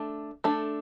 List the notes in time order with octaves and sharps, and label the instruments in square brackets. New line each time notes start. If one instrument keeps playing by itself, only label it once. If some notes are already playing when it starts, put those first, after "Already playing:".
Already playing: [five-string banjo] A3 D4 A4
A3 D4 A4